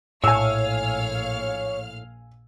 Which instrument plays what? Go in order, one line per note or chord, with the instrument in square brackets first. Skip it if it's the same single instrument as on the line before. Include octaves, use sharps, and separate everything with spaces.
[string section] A#1 F5 F6 [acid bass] A2 [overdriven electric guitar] C#5 [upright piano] G#5 E6